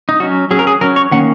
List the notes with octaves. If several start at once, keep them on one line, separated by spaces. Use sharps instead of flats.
D#4
F#3 C#4 F#4
F#3 C#4 G#4
A#4
G#4
F#3 C#4 A#4
C#5
D#3 A#3 C#4 F#5